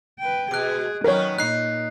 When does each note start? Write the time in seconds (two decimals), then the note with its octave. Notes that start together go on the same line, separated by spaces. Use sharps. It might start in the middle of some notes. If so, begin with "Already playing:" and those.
0.19 B4 G5
0.51 B2 G#4 F#6 D7
1.04 D#3 F#3 B3 C#4 A#4 C#5
1.39 A#2 D#4 F#6 C7